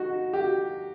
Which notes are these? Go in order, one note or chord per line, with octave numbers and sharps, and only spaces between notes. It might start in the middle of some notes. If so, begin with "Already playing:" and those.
Already playing: D#4 F#4
G4